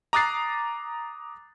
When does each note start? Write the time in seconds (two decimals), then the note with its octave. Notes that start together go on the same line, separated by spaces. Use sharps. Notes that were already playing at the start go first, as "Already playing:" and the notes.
0.13 A#5 D6 D#6 F#6 A6 C7